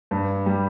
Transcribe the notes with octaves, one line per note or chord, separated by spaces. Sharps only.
G2
G3